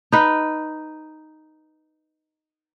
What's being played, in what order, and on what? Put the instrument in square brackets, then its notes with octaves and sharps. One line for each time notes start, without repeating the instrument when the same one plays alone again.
[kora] D#4 B4